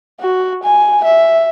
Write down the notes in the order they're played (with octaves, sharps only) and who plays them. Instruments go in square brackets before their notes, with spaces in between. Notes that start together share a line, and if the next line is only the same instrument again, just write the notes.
[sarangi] F#4
G#5
E5